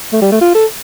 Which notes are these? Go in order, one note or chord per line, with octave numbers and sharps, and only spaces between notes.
A3
G3
A3
F4
A4